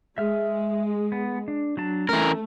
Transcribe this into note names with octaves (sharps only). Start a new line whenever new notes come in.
G#3 E5 F6
B3
D4
F#3 D4 A5
E3 A3 C4 C#4 A#4